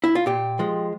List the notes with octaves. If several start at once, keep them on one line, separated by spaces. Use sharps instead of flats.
E4
F4
A#2 G4
F3 G#3